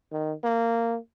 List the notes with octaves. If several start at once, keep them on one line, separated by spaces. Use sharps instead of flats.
D#3
A#3